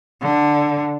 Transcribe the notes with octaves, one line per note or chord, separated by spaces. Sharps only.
D3